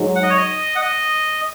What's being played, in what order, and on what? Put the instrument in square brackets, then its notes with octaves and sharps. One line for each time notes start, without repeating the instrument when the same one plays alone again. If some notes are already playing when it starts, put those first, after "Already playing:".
Already playing: [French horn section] G#2 F#3 D#4 G#4
[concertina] F#5
D#5
C#5
D#5
F#5
D#5